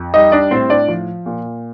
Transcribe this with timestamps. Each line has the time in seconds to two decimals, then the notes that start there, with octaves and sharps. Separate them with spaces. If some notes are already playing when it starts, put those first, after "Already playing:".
Already playing: F2
0.14 G3 D#4 D#5
0.32 D4 D5
0.51 A2 C4 C5
0.70 D4 D5
0.88 F3
1.26 A#2